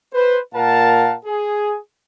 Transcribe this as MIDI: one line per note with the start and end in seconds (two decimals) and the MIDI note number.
0.14 0.39 71
0.14 0.39 72
0.55 1.16 46
0.55 1.16 70
0.55 1.16 77
0.55 1.16 78
0.55 1.16 81
1.26 1.78 68